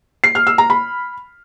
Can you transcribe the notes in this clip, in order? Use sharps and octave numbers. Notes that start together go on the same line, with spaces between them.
C7
F6
E6
A#5
B5